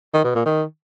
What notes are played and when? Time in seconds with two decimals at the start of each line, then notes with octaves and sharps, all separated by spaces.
0.13 D#3
0.24 B2
0.35 A#2
0.46 D#3